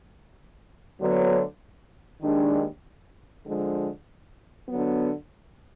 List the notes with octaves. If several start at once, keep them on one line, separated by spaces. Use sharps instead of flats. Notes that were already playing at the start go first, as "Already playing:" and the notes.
D2 D3 F#3 B3
D#2 D#3 G#3 D4
D3 F3 G#3
D3 F#3 B3